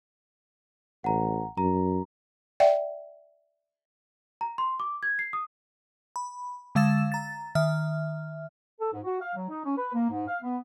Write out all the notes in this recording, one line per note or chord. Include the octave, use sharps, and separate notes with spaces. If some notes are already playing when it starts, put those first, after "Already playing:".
A1 F#5 A#5
F#2 A#5
D5 E5 F#5 G5
A#5
C6
D6
G#6
C7
D#6
B5
D3 G#3 F5 E6 A6 E7
A#5 A6
D#3 E5 F6
A4
G#2
F#4
F5
F#3
D#4
C#4
B4
A#3
G#2
F5
B3